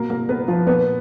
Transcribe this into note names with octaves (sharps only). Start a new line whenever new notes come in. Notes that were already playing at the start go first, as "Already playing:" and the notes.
Already playing: B2 A#3 A#4
A#3 A#4
B3 B4
F3 F4
A#2 B3 B4